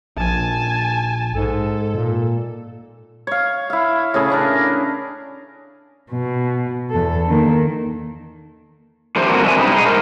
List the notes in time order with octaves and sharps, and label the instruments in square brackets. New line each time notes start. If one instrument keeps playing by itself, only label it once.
[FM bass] A#1 [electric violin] G#5 A5
[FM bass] G#2 [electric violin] A4
[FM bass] A#2
[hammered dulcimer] C#5 F5
E4 F5
A2 C#3 G#4 C#5
C#4 D4 A#4
[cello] B2
E2 A4
D#3 A#3
[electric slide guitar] A2 D3 E3 G4 C5
G3 A#3 C4 D4 F#4 A#4
A3 C4 D4 E5 G#5
G#2 B2 G3 B3 D#4 E4
D#4 G#4
G#2 A#4 C5